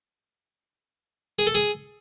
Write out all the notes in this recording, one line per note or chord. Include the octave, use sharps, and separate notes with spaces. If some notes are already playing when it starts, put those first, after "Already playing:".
G#4
A4
G#4